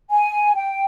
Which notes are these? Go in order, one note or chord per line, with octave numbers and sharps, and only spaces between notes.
G#5
G5